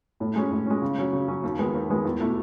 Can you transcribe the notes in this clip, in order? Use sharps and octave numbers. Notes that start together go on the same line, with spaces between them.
A2
G#3 C#4
A2
G#3 C#4
C#3
F#3 C#4
C#3
F#3 C#4
D#2
D#3 G#3 B3
D#2
D#3 G#3 B3
E2
B2 A3 E4